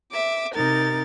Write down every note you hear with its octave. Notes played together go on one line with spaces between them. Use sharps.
E5 D6
C3 D#4 A#4 A6